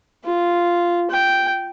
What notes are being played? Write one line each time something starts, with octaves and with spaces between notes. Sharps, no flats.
F4
G5